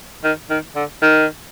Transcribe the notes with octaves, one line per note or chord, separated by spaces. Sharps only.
D#3
D#3
D3
D#3